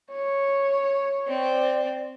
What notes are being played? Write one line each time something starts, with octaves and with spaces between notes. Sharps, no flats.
C#5
C4 D5